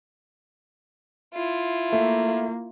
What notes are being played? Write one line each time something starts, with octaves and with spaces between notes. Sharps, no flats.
E4 F4
A3 A#3